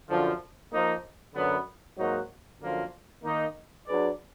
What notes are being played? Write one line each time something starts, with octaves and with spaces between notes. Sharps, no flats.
F#2 D3 F3
F3 A#3 D#4
F#2 D3 F#3 B3
G#2 F#3 A#3 D#4 F#4
F#2 D3 F3 A#3 F4
D#3 A#3 D#4
F#3 D4 G#4 B4 D5